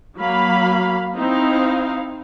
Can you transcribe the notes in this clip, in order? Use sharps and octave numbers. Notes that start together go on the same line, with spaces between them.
F#3 A#3 F5 B5
C4 D#4 E4 F5